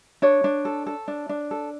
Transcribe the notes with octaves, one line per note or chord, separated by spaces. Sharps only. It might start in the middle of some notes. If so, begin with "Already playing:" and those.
D4 C#5
D4
A4
A4
D4
D4
A4